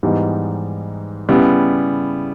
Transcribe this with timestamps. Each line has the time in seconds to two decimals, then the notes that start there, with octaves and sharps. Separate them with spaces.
0.03 G#2 E3 G3 B3 D#4
1.29 C#3 G3 B3 E4